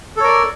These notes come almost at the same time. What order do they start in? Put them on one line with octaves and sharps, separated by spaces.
A4 C#5 A#4 D5